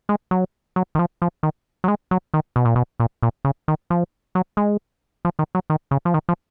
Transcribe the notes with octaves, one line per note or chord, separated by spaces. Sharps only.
G#3
F#3
F#3
D#3
F3
F3
D#3
F#3
G#3
F#3
D#3
B2
A#2
B2
A#2
A#2
C#3
D#3
F3
F#3
G#3
F3
D#3
F#3
D#3
C#3
F3
D#3
F3